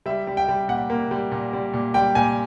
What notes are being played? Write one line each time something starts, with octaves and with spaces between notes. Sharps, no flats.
G3 E5
G3
G5
G3
A#2 F#5
A#3
G3
A#2
G3
A#2
G3 G5
A#2 G#5